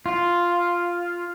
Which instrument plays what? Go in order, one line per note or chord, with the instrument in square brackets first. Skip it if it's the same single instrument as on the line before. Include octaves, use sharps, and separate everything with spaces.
[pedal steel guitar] F4